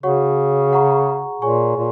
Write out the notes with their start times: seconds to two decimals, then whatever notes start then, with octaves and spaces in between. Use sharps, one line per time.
0.03 C#3 F#4 C#5 F#5 C#6
0.72 G#4 F#5 A#5 C#6
1.42 A#2 G#4 C#5 G#5 C#6
1.77 A#2